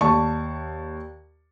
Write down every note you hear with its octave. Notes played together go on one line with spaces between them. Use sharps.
D#2 D5 A5 C#6